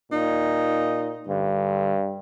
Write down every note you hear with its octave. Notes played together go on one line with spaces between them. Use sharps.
A#2 D#4
G2 D3